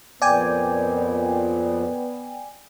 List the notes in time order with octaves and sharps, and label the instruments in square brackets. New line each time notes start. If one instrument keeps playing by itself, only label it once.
[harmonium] F2 A#2 [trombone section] B3 [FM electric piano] D5 G5 G#5